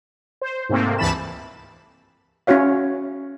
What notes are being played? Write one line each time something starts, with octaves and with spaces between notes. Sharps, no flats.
C5
G#2 C3 A3 A#3 C4
C#2 G2 E3 A5 B5 E7
C#4 E4 F#4 C#5 F5